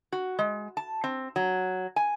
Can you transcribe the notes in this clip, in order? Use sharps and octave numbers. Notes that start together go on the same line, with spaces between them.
F#4
G#3
A5
C4
F#3
G#5